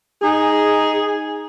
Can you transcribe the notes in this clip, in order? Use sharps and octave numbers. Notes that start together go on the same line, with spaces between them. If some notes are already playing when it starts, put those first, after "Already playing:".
D#4 G#4